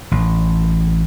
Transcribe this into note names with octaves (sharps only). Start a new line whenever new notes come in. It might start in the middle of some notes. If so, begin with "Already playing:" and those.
A1